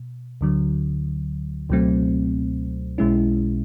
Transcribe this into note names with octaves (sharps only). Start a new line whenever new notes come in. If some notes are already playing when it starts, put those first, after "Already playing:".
Already playing: B2
D2 D3 F#3
C#2 B2 F#3 A3 C4
B1 B2 G#3 C#4 E4